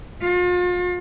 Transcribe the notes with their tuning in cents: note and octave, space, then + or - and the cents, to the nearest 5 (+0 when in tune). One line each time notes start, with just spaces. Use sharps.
F4 +40